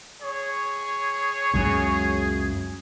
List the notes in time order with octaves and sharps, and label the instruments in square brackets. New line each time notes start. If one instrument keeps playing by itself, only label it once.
[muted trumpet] G#4 [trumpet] C#5
[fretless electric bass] C#2 F#2 C#3 [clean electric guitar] G#3 F#4 G#5